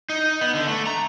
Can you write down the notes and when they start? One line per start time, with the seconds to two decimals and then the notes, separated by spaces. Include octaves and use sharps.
0.09 D#4
0.41 B3
0.55 D3
0.68 A3
0.87 A#5